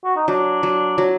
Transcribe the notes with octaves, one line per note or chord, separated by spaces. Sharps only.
F#4
D#4
F#3 D4
F#3
F#3